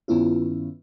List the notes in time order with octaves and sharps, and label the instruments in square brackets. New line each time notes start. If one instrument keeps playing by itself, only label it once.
[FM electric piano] G2 D#3 B3 C#4 E4 F4